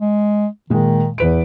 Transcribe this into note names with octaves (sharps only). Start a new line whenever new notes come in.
G#3
A#2 D#3 G#3
E2 E3 B4 D7